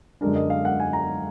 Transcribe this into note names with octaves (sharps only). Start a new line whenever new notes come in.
F#2 D3 G#3 D4 A#4
D#5
F5
F#5
G#5
A#5